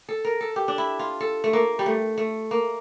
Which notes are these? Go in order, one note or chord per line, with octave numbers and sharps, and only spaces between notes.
A4
A#4
A4
G4
D4
E4
F4
A4
A3
A#3
G3
A3
A3
A#3